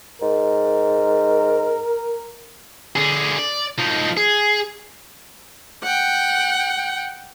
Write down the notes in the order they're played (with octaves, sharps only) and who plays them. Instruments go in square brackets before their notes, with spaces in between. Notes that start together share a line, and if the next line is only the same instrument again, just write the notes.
[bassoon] G#2 [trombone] A#4
[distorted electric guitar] D3 G#4
D5
F3 D#4
G#4
[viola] F#5 G5